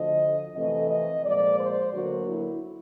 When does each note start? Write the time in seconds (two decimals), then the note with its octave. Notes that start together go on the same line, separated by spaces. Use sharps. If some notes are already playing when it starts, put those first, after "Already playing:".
Already playing: D2 D3 F3 D#5
0.54 F2 C3 E3 A3 D#5
0.89 D#5
1.24 A#2 F3 G#3 D5
1.59 C5
1.93 D2 D3 F#3 A#3 F#4
2.28 E4